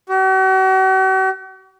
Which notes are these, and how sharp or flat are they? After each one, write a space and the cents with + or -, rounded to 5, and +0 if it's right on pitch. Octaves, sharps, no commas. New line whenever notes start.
F#4 +45